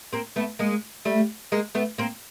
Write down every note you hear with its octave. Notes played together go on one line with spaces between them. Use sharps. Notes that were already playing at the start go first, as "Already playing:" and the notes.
A#3 C4
A3 B3
G#3 A#3
G3 A3
G#3 A#3
A3 B3
A#3 C4